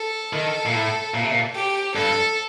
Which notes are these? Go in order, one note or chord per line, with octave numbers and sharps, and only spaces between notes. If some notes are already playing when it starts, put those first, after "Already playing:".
Already playing: A4
D#3
A#2
A2
A#2
C3
A#2
G4
G2 A4